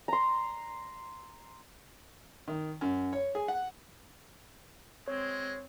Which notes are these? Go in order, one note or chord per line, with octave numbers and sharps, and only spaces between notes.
A#5 C6
D#3
F#2
C#5
G#4
F#5
G#3 C4 C#5